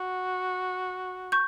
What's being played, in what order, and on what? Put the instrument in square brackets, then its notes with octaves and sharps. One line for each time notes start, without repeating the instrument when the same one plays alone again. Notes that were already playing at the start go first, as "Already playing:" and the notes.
Already playing: [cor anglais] F#4 [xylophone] F#5
[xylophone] C#6 G6